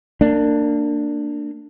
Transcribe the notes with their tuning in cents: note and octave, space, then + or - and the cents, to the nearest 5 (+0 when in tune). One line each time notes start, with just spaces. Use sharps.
A#3 -30 D4 +5